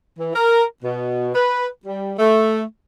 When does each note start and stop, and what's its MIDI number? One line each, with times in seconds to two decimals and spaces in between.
0.18 0.30 52
0.34 0.63 70
0.82 1.29 47
1.35 1.67 71
1.85 2.13 55
2.18 2.62 57